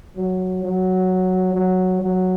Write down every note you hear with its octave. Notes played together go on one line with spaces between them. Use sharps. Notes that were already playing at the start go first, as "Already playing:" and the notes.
F#3
F#3
F#3
F#3